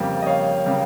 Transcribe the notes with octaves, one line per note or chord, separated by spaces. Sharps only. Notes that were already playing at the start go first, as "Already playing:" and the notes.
Already playing: F2 C#3 G3 A#3
D#5
C#5 F5
C#3 G3 A#3